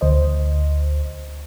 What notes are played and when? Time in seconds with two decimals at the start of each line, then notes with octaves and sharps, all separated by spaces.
0.01 D2 C5 D#5